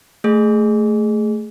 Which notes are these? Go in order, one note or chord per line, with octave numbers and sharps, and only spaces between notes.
A3 G#4